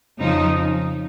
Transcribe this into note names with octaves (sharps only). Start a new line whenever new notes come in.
F2 C#3 F3 D#4